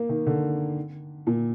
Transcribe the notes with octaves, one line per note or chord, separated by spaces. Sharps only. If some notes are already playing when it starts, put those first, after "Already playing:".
Already playing: A#3
D#3
D3
A#2